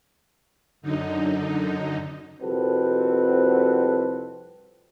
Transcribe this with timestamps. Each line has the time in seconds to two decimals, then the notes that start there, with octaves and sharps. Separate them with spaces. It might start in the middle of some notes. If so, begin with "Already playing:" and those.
0.82 F#2 D3 D#4
2.42 C2 F2 C4 F#4 A4 B4